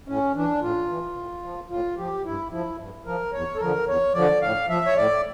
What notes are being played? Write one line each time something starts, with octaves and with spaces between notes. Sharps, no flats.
A2 C#4
E3 D4
A2 F4
E3
A2
F3
A2 F4
F3 G4
G2 E4
F3 E4
G2
F3 A#4
E2 C#5
A4
D3 F3 A#4
E2 C#5
D3 F3 D5
A2 F5
F3 E5
C#5
A2 D5